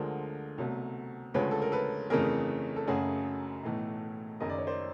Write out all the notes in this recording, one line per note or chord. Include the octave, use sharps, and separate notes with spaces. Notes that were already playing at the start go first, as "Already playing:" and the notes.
Already playing: D2 D3 F3 G#3 A#4 C5
C2 B2 F#3 A3
D2 C#3 F3 G#3 B4 C#5
A4
A#4
A4 B4
G1 F2 C#3 E3 A3 G#4 A#4
A4
F#1 F#2 C#3 F#3 A3 F#4 G#4
B1 A2 E3 A3
F#1 F#2 D#3 D#5
D5
C#5
C5 D5